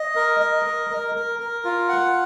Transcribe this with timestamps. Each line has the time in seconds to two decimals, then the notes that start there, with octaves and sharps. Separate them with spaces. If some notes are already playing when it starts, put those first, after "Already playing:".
Already playing: D#5
0.16 A#4
0.40 D#5
0.65 A#4
0.90 A#4
1.15 A#4
1.40 A#4
1.65 F4
1.88 F#5